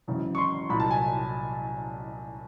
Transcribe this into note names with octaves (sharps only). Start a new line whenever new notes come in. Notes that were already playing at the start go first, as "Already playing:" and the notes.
G#1 F#2 C#3 E3
C#6
C6
C2 A#2 F#3 B5
A5
G#5